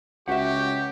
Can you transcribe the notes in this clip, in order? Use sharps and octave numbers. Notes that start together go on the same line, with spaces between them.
C#2 F#4 G4 E5 F#5